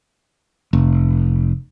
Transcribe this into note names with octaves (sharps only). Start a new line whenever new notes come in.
F1